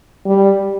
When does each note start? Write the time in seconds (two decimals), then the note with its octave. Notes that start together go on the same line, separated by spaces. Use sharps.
0.26 G3